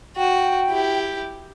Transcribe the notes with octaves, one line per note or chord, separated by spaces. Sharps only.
F#4 G5
E4 G4